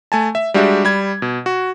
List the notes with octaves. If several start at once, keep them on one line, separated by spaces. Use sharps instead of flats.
A3 G#5 A5
E5
G3 G#3 D4 F#4 G4 E5
G3 B5 G#6
B2
F#4